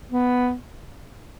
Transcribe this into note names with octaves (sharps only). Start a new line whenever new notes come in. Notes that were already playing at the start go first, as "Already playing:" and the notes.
B3